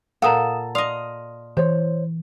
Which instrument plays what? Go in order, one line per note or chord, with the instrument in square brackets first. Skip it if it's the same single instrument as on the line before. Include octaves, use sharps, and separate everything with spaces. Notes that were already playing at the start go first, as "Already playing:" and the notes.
[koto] A#2 A4 [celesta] F5 D#6 E7 [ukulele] F#5 A#5
[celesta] D5 C6 D#6 [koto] D#5 F5
[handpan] E3 [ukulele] C5 C#5